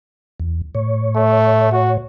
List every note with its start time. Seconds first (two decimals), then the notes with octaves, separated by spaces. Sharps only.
0.40 E2
0.75 A2 C#5
1.16 A3
1.72 F#4